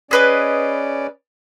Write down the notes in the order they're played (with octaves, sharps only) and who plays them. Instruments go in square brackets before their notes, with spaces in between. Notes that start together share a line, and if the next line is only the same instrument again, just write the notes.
[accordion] C#4 D5 [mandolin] G#4 B4 D#5